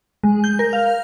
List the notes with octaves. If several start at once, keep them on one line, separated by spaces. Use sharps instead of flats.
G#3
G6
A#4
F5